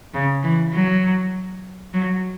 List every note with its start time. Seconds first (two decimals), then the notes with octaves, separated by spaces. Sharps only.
0.14 C#3
0.43 E3
0.73 F#3
1.94 F#3